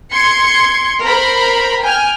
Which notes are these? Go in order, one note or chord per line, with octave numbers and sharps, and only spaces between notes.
C6 G#6 C#7
A#4 C5 A#5 B5
G5 G#5 F6